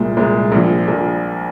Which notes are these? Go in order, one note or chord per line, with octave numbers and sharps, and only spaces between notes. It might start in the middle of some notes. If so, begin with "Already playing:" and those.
Already playing: C2 A#2 G#3
C2 A#2 G#3
A#1 A#2 F3
A#1 A#2 F3